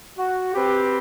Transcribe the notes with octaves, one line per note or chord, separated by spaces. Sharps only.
F#4
C4 G4 B4